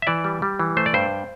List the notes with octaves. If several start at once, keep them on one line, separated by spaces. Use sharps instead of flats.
E5
E3 D5
G3
G3
E3
A3 C5
D5
G2 C5